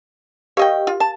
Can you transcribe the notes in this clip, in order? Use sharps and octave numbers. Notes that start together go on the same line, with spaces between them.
G4 A#4 C#5 D#5 F5 G5
F4
A5